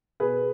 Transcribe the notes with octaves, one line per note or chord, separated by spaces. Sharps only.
B2 G#4 B4